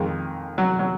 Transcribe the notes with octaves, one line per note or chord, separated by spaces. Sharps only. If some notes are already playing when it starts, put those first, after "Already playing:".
Already playing: F2 D#3 G#3
F#3
F#3